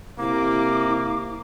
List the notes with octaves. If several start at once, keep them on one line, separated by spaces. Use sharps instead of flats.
C3 A#3 E4 D6